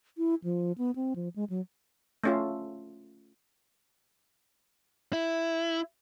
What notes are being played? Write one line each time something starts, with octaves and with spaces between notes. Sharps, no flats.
E4
F3
B3
C4
F3
G#3
F#3
A3 C#4 F4
E4